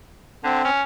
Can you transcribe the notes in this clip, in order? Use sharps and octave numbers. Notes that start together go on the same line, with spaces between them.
D3 C4
C#4